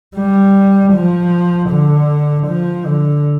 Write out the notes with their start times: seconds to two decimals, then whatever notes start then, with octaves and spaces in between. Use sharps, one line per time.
0.17 G3
0.93 F3
1.70 D3
2.48 F3
2.86 D3